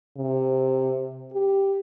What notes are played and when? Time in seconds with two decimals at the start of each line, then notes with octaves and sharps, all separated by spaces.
0.18 C3
1.33 G4